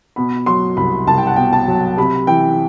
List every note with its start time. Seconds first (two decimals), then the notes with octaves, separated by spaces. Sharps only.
0.16 B2 B5
0.46 F#3 C6
0.77 C2 B5
1.07 C2 A5
1.18 G5
1.27 F#5
1.36 B2 G5
1.53 A5
1.67 F#3
1.97 C3 B5
2.27 E3 G5